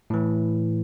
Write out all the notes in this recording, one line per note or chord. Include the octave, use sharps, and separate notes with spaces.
A2 E3